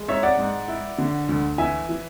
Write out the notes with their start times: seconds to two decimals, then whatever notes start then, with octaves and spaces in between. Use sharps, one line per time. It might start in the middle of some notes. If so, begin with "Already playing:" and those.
Already playing: G#3
0.08 G#2 C#5 E5
0.23 D5 F#5
0.38 G#2
0.68 E4
0.98 D3
1.29 D2
1.58 E3 E5 G#5
1.89 E3